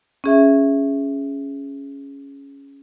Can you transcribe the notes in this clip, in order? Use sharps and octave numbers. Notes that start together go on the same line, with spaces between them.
C#4 G#4 E5